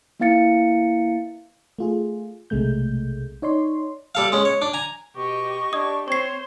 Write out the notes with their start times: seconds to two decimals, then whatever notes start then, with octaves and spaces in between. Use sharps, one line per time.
0.20 A#3 B3 E4 F5 A6 C#7
1.79 A3 F4 G#4
2.50 B1 C3 G#3 A3 G6
3.42 D#4 C#5 D5 C6
4.15 G3 A4 F5
4.32 G#3 C#4
4.45 C#5
4.62 D4
4.74 G#5 A#5
5.16 B2 G4 D#5 C#6
5.73 D4 G4 D#5 D#6
6.08 C4 C5 C#5 C#6 C7